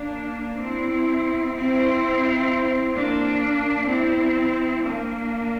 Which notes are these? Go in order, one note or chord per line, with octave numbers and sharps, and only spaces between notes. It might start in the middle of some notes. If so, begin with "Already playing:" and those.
Already playing: A#3 D4
C4 E4
C4 E4
A#3 D4
C4 E4
A#3 D4